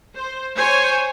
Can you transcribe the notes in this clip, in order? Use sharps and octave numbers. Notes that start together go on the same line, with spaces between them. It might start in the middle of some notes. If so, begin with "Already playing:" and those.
C5
C5 C#5 G#5